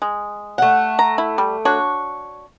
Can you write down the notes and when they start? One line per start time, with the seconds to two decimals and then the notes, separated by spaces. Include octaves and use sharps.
0.02 G#3
0.58 A3 F#5
0.99 A#5
1.18 E4
1.38 G3
1.65 D4 F#4 C#5